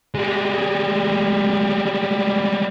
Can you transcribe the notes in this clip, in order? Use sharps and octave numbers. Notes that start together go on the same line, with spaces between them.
G3 G#3